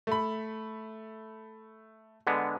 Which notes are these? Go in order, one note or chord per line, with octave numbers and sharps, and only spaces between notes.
A3 B5
D3 G#3 B3